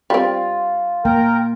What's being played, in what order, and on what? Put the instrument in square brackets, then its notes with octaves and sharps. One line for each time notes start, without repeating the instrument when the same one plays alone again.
[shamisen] G3 C4 [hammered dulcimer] F4
[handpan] A#3 [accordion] A#4 G5 A#5